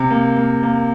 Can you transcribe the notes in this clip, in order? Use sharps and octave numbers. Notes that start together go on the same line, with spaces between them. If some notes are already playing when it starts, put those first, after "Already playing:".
Already playing: C3
A#3
A#3
A#3